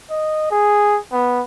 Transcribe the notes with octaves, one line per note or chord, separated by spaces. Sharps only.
D#5
G#4
B3